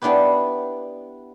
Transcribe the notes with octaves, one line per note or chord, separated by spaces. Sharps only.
B3 D4 E4 G4 B4